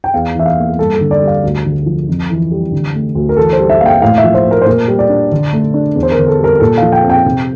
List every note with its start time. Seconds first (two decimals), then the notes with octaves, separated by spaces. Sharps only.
0.04 G5
0.14 E2 F5
0.35 E3 E5
0.46 F5
0.57 A#3
0.78 G2 A4
0.95 A4
1.01 D3
1.11 D5
1.21 G3
1.27 F5
1.43 D2
1.65 D3
1.86 F3
2.08 F2
2.30 E3
2.51 G3
2.72 D3
2.94 A3
3.15 D2
3.29 A#4
3.37 E3 A4
3.53 C5
3.59 G3
3.69 E5
3.81 A#3 F5
3.86 G5
4.02 A2 F5
4.18 E5
4.24 F3
4.34 C5
4.45 A3
4.51 A#4
4.62 C5
4.66 A#2 A#4
4.88 G3
4.99 D5
5.09 D4
5.32 D3
5.53 A3
5.74 D4
5.95 E2
6.03 C5
6.12 A#4
6.17 D3
6.28 A4
6.40 G3 A#4
6.60 A#2 A4
6.77 F3 F5
6.92 G5
7.04 C4
7.10 G5
7.26 C3